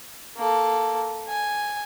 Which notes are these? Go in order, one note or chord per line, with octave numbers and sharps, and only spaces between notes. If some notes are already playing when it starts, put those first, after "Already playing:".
A#3 A4
G#5